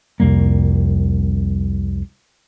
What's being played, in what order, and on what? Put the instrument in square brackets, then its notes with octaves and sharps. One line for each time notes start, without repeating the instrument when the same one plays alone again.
[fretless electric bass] C2 F2 G3 A#3